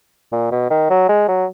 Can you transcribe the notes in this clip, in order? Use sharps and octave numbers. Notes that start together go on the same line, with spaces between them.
A#2
B2
D#3
F#3
G#3
F#3